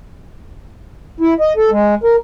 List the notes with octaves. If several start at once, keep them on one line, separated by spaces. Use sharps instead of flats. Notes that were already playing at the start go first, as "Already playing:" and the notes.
E4
D#5
A4
G#3
A#4